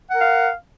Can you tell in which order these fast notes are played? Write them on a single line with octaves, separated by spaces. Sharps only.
F#5 A#4 F5